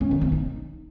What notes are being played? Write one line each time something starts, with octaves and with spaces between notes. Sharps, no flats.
C#4
D#3
C4
D#4